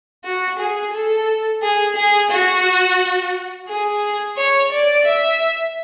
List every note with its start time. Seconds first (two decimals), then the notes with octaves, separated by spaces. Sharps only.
0.24 F#4
0.59 G#4
0.94 A4
1.63 G#4
1.96 G#4
2.31 F#4
3.69 G#4
4.37 C#5
4.72 D5
5.06 E5